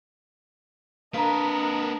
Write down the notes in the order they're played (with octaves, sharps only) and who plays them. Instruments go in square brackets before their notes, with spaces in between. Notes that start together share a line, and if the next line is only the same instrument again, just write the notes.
[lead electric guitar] A#3 B4 [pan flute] D4 [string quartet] A#4 D#5 [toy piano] F5 A#5